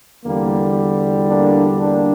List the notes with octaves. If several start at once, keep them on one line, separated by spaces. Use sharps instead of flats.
E2 D3 G3 A#3
A#3 D4
A#3 D4